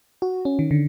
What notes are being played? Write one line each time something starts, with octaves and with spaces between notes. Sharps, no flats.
F#4
C#4
D#3
D3